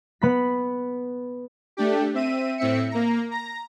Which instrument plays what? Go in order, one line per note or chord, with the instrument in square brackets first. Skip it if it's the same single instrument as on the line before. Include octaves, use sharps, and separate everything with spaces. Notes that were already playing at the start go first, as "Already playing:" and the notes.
[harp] B3 B5 B6
[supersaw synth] A3 D4 G4
C4 E5 D#7
A2 C4 E5 C#7
A#3 A#5
A#5 A#6